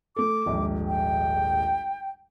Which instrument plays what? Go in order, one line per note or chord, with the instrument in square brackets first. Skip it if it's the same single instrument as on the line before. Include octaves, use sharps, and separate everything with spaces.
[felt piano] A3 A4 [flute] D6
[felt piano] D#1 A#1 G#2
[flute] G5